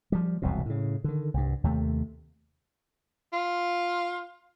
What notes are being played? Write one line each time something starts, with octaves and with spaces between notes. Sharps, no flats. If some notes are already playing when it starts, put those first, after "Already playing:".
F3 G3
E1 C2 F2 B2
A2 C#3
D3 D#3
C2 G2
D#2 C3 A3
F4